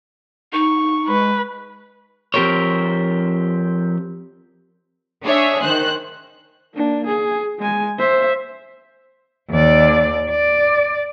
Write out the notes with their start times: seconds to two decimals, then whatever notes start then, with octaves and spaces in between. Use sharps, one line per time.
0.53 D#4 C#6
1.08 G#3 B4
2.34 F3 C4 G4 A#4 C5 C#5
5.24 D4 G#4 C#5 E5
5.62 D#3 C5 F#6
6.75 A#3 D4
7.07 G#4
7.59 G#3 G#5
7.99 C5 E5
9.50 D#2 D5
10.30 D5